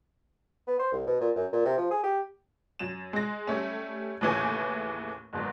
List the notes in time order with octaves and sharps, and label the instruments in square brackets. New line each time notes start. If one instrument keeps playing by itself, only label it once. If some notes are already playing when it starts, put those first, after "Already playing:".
[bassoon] B3
C5
C2
B2
A#2
F#2
A#2
C3
F3
G#4
G4
[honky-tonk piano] F#2 E7
G#3 A#6
G3 A3 C#4
D#2 A2 C#3 E3 A3 G#5
F#1 E2 G#2